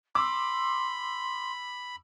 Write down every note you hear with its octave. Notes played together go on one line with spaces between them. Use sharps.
B5 C6 D6 E6